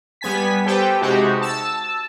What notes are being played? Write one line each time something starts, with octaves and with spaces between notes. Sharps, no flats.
G3 B3 G#5 B6
G4 A4 B4 C5 G5
C3 G#3 D#4 F#4 G4
A5 E6